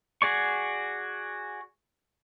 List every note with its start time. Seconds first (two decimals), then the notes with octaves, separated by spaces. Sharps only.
0.22 F#4 G#4 D5 C#6